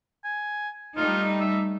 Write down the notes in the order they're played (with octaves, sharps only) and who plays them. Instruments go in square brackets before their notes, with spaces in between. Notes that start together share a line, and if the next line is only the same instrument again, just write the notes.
[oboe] G#5
[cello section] G3 A3 D#4 [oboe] F4
[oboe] E5